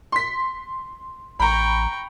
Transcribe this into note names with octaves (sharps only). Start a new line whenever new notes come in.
C6 B6
A1 G5 A#5 B5 C#6